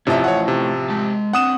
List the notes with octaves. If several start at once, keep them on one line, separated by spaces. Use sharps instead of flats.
A1 A2 C3 F3 C#4 E5
C#5 F#5
C3
G#3 A5
C4 D4 F#5 D#6 E7